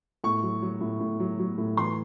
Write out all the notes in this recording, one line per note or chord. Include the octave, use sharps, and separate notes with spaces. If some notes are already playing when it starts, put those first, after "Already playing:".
A2 C#6
F#3
F#3
A2
A2
F#3
F#3
A2
E3 C6